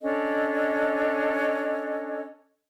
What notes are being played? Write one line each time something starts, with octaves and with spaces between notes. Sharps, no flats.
C#4 D4 A4 D#5